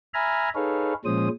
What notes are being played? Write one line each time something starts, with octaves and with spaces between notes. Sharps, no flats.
E5 G#5 A#5 B5 F6
D#4 G#4 A4 B4 C#5 F5
A#2 F3 G#3 C#4 C5 D#6